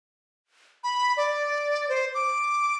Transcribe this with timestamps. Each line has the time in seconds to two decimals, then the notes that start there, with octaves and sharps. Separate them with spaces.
0.84 B5
1.17 D5
1.89 C5
2.14 D6